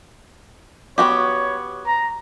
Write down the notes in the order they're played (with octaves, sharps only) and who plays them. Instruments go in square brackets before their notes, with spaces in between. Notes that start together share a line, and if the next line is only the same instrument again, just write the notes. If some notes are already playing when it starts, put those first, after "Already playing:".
[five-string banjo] B3 F#4 G4 [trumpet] C#5
[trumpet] A#5